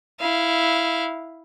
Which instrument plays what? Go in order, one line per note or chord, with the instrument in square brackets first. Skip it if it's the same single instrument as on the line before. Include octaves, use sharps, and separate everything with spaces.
[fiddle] E4 F5